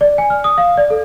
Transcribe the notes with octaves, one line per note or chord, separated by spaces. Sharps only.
D5
G#5
F6
D#6
F5
D5
A4